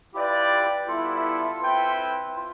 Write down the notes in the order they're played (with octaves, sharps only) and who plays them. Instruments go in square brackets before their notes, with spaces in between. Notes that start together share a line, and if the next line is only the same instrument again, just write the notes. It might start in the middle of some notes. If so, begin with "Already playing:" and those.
[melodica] E4 G4 [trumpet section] F4 B4 D5 G5
[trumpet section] G3 B3 E4 [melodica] F4 A4
[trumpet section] C4 E4 B4 E5 G5
[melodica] F4